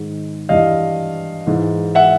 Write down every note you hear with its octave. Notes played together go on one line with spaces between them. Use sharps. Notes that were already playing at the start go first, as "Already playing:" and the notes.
Already playing: G#2 D#3 G#3
G2 E3 G3 D#5 F5
G#2 E3 G#3
E5 F#5